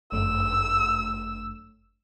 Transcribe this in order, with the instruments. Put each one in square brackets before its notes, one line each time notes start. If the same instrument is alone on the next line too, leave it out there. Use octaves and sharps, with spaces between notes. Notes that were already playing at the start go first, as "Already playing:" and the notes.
[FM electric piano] G1 F#2 A3 [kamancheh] E6